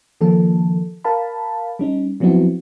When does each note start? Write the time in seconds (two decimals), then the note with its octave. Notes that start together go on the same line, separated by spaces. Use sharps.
0.21 D#3 F3 A#3 A4
1.04 A#4 F5 A5 B5
1.79 G3 C#4 D#4
2.20 F3 F#3 B3 C4 E4 F#4